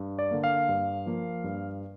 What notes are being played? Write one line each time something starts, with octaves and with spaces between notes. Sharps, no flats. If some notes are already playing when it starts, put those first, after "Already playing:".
Already playing: G2
D5
D3 A#3
F5
G2
F3 A#3
G2